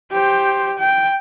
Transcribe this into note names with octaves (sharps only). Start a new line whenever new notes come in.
G4 C5
G5